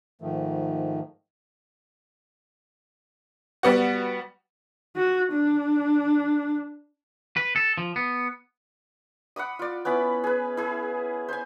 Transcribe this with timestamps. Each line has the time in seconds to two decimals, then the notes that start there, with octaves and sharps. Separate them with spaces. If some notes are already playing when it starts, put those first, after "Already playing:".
0.21 G#2 D#3 F3 A3
3.63 G3 B3 F#4
4.96 F#4
5.32 D4
7.37 B4
7.56 A4
7.78 F3
7.96 B3
9.36 F#5 B5 D6 D#6
9.59 F4 D5
9.85 B3 C#4 E4 B5
10.24 G#4 B4
10.57 E4 G#4
11.29 C5 G#5